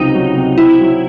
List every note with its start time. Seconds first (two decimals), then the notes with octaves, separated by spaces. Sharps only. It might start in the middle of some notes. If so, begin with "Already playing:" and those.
Already playing: C#2 C3 F#3 C4 D#4
0.14 F#3
0.36 C3
0.58 C4 E4
0.80 F#3